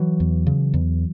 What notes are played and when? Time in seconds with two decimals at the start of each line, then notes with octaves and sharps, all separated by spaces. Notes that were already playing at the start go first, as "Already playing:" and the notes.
Already playing: E3 F#3
0.20 E2
0.47 C#3
0.74 E2